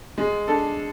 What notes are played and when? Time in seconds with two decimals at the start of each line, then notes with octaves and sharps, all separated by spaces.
0.18 G#3
0.48 D4 A4